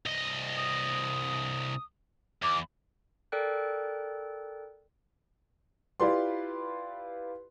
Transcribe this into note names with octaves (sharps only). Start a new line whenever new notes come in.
C2 D#5
D#6
E2 D6
A4 A#4 D5 G5 F#6
E4 F4 G4 B4 D5 C6